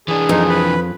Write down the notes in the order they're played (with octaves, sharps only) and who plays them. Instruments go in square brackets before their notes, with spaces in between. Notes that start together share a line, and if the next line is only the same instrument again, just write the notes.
[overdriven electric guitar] E3 D4 [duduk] G#4
[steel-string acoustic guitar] F2 [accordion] D#4
[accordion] B4